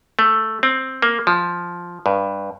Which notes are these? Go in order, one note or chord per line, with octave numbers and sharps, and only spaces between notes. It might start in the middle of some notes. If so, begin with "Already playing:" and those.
A3
C4
A#3
F3
G2